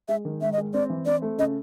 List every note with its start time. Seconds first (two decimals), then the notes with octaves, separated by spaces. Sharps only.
0.08 G#3 E5
0.25 D#3
0.41 G#2 E5
0.52 D#5
0.57 G#3
0.74 C4 D5
0.90 E3
1.06 C4 D5
1.22 A3
1.38 C#3 D#5